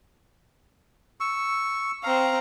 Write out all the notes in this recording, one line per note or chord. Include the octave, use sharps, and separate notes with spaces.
C#6 E6
C4 F5 A#5